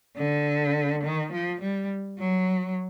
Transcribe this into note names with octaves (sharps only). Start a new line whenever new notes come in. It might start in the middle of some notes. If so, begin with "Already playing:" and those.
D3
D#3
F3
G3
F#3